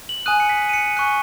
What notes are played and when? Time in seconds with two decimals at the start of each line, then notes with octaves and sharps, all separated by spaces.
0.09 F#7
0.26 G#5 D#6 F#6 D#7
0.40 C#7
0.49 B6
0.69 D#7
0.73 C#7
0.97 G#5 C#6 F#6 C#7